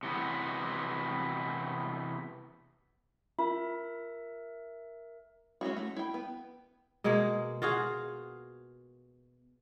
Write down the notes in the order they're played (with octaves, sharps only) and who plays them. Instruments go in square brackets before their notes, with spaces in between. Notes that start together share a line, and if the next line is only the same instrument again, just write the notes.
[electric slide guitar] C3 E3 B3
[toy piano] F4 [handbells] A#4 E5
[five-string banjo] G#3 C#4 E4 F#4
A3
E4 G5
B3
[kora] B2 G#3 A#3 G#4
F4 F#4 G#4 F5